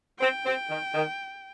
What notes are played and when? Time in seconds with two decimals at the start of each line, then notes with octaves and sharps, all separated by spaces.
0.19 C4 G5
0.45 C4
0.70 D#3
0.94 D#3